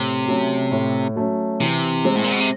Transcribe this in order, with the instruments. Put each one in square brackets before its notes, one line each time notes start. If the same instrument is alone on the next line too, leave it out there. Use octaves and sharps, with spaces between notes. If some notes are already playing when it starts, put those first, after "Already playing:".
Already playing: [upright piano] A2 [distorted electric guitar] C3
[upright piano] F#3 A3 C#4
A2
F#3 A3 C#4
[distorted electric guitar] C3 [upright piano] E3
[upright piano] G#3 C4
[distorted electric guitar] A2
A#2
B2
C3